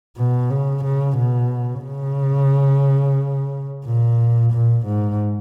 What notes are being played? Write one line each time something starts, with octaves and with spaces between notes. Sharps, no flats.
B2
C#3
C#3
B2
C#3
A#2
A#2
G#2